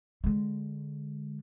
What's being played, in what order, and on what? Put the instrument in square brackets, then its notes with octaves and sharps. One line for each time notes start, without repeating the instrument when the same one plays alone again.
[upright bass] D3 G#3